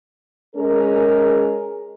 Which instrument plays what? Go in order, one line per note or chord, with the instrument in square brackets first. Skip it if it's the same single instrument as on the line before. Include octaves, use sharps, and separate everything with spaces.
[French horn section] G#3 C#4 G#4 A#4